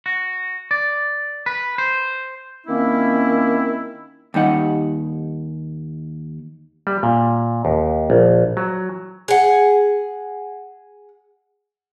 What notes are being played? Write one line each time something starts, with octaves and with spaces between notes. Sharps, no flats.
F#4
D5
B4
C5
D#3 A#3 C4 C#4 E4
D#2 G3 D#4 F#5
G3
A#2
D#2
A#1
F#3
G#4 F#5